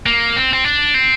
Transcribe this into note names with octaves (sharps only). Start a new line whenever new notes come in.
A#3
C4
C4
D4
C4